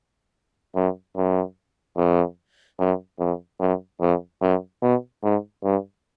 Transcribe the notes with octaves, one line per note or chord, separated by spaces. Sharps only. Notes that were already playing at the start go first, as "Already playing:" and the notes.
F#2
F#2
F2
F#2
F2
F#2
F2
F#2
B2
G#2
G2